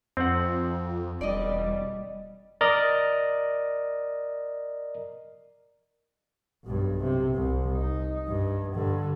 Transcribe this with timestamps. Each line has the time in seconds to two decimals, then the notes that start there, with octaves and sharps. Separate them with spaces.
0.17 F2 C4 F#5
1.21 E1 G3 D5 D#5
2.61 A#4 D5 D#5
6.65 B1 G2
7.04 C3
7.35 C2
7.74 D#4
8.28 G2
8.74 G2 D3